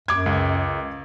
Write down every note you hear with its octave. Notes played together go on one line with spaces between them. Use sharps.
F#2 D6 G#6
C#2